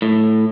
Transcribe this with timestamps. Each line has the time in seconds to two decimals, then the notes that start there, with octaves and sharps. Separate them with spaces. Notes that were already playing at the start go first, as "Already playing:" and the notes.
0.02 A2